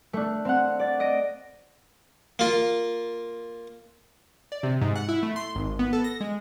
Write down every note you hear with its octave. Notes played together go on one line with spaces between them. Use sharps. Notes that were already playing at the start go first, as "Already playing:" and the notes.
A3 D4
C4 F5 F#5
D5 A6
D#5 A#6 D7
A#3 F4
D5
C3
G#2
F#5
E4
A3
C6
G#1
B3
A4
A#6
G#3